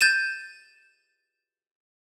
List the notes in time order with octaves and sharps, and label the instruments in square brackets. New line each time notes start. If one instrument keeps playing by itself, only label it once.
[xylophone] G6 A6 D#7 E7